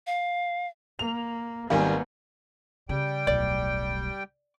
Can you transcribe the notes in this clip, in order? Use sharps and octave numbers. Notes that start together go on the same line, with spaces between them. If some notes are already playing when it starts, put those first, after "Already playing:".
F5
A#3 F7
G#1 D#3 G3 A#3 B3 F5 G#5
C#3 G3 G5
D1 B1 D5